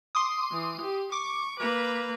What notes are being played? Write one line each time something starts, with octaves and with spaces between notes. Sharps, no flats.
C6 D6 D#6
E3
G4
C#6 D6
A#3 B4